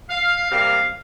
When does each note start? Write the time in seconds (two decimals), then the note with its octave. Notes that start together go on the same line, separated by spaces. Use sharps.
0.10 F5
0.49 C3 G3 A#3 F5